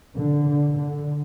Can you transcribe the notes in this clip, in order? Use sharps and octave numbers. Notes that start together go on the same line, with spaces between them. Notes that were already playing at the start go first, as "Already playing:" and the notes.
D3
D3
D3